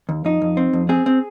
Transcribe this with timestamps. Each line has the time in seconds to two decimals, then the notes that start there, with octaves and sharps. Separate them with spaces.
0.09 D#2
0.25 F2 D#4
0.42 F2
0.57 C4
0.73 F2
0.89 C4 G#4
1.06 C4